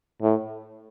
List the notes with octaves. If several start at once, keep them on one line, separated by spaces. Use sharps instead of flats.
A2